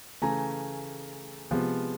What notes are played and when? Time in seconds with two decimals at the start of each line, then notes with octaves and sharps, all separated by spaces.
0.22 C#3 E3 A3 G#5 A#5
1.51 C3 F3 G#3 B3